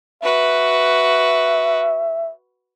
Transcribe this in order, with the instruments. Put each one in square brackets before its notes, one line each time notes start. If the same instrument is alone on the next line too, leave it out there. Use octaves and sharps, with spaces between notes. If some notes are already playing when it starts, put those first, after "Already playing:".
[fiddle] F#4 B4 [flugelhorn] E5